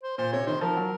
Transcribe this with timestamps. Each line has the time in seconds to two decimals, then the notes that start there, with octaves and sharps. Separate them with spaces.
0.04 C5
0.18 A#2 C5
0.33 C3 C#5
0.47 D#3 C5
0.61 F3 A#4
0.76 F#3